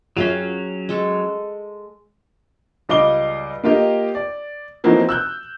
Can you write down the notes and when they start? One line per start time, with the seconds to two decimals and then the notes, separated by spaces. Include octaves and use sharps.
0.17 F#2 F#3 C#4 F4 G#4 F5 G5
0.89 G#3 A4 C#6
2.89 C#2 G3 D#5 F5 D6 G7
3.64 A#3 F4 G4 D#5
4.15 D5
4.84 E3 F3 A#3 C4 D#4 F#4
5.09 E6 F#6 G6